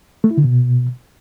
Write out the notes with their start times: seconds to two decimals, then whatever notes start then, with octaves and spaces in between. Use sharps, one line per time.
0.24 A3
0.31 E4
0.37 D3
0.44 B2